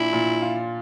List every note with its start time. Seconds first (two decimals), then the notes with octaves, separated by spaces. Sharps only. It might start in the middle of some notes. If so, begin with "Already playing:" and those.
Already playing: A#2 D4 E4
0.13 A#2
0.42 F4